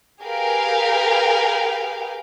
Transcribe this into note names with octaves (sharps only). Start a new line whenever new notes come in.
G4 G#4 A#4 B4 F5 G5